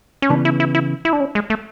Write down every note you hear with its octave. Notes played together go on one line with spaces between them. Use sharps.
C#4
C#3 E3 B3 D4
E4
E4
E4
E4
D4
C#4
G#3
A3